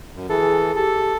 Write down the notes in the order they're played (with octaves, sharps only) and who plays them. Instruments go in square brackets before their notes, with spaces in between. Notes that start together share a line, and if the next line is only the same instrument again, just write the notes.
[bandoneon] F#2
[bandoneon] E3 A4 [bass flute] G#4
[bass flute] G4 [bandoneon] A4